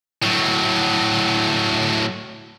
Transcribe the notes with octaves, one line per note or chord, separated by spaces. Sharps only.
A2 F#3